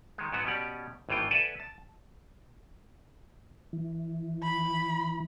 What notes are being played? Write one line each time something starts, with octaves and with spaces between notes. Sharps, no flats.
D#3 G#3
G#2 F#3 B3 F#4
B2 C#4 G4 D5
G#1 A2 E3 F4 G5
A4 B4 D5 E5 F#5 G#5
A5
E3
B5